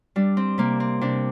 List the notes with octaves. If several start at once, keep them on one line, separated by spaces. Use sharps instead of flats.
G3 D4
C4
C3 A#3
C4
C3 D4